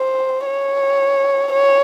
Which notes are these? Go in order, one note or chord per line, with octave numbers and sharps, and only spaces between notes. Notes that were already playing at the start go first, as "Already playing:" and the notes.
Already playing: C5
C#5
C#5